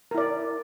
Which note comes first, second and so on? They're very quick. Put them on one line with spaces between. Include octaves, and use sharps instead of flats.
A#4 E4 D5